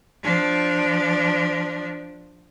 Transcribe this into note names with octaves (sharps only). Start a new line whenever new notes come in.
F3 D4